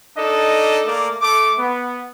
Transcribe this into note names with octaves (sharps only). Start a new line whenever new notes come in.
D4 D#4 A4 D#5
A3 A#3 A#4 D5 D6
A3 D6
B3